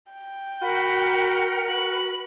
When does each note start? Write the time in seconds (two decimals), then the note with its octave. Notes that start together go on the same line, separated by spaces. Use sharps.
0.12 G5
0.62 F#4 A#4 F#5 B5 F6
1.69 F#4 B4 F#7